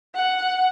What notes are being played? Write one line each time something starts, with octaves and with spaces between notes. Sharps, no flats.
F#5